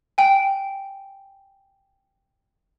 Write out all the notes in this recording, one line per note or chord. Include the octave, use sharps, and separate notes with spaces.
G5 G#5